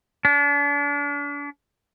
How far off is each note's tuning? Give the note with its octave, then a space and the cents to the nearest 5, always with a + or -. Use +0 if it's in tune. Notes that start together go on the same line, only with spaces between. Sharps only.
D4 -40